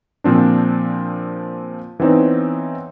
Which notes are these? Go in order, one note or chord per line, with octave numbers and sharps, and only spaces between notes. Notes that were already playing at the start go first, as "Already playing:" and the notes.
A#2 F3 C4 D4
E3 B3 C4 D#4 C#5